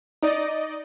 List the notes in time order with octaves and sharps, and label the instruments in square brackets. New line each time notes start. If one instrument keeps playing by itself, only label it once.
[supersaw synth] D#4 D5 D#5